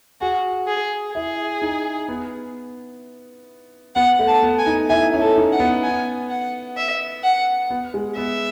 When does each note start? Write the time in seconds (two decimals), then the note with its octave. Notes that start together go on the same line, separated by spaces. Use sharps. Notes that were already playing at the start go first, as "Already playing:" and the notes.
0.21 F#4 G#4
0.68 G#4
1.14 E4 G#4
1.62 D#4
2.08 B3
3.95 B3 F#5
4.19 A3
4.27 A5
4.43 B3
4.58 G#5
4.66 D#4
4.89 E4 G#5
5.14 C#4
5.21 A4
5.36 D#4
5.52 F#5
5.60 B3
5.83 G#5
6.30 F#5
6.77 E5
7.24 F#5
7.70 B3
7.94 G#3
8.17 B3 E5